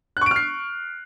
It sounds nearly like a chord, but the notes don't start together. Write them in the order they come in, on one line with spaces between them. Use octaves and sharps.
F#6 C#6 D7 F6 C7